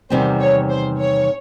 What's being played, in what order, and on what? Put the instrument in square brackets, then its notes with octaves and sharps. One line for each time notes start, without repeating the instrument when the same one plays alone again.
[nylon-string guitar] E2 C3 D#3 G3 C4 [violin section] C5
[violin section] C#5
C5
C#5